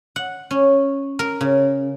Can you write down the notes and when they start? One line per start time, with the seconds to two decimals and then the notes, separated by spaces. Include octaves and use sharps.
0.16 F#5
0.51 C#4
1.19 A#4
1.41 C#3